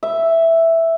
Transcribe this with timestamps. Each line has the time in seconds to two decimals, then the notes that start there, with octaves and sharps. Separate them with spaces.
0.03 E5